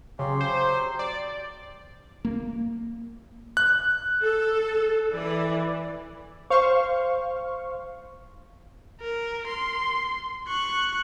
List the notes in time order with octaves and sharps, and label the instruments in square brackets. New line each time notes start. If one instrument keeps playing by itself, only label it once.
[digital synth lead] C#3 [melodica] F#3 G4 C6
[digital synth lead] C5
D5
[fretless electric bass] A#3
[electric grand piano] F#6
[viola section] A4
E3 D5
[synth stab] C5 F5 C#6
[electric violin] A#4
C6
C#6 F#6